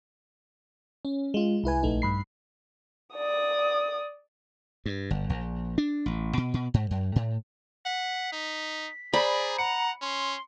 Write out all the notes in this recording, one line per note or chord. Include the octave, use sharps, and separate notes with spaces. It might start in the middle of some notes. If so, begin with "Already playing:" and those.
C#4
G#3 F4
C2 E4 B4 G#5
A#1 A3 D#4
G2 B5 C7
D5 D#6
G2
G1
A#1
D4
A1
B2
B2
G#2
F#2
A2
F#5 B6
D#4
G#4 C5 D5 A#5 B5
F#5 A#5 C#7
C#4 C6